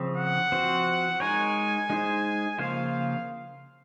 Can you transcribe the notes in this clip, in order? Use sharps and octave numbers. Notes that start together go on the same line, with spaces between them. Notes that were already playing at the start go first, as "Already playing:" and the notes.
Already playing: C#3 F3 C4
F#5
F3 C4 F#4 C5
G#3 D#4 A#4 C#5 G#5
G#3 D#4 G#4 C5
C#3 F3 A#3 F4 C5 F5